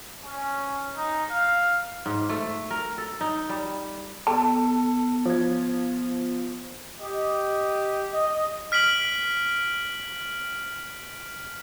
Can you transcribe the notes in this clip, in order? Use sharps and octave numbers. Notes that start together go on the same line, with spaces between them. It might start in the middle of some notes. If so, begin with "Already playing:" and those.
C#4
D#4
F5
G#2
A3
A#4
A4
D#4
G3
B3 A4 A5
F3 G#6
G4 D#5
D#5
F6 B6 D7 F#7